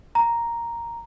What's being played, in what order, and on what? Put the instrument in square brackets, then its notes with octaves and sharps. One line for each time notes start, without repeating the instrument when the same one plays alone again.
[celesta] A#5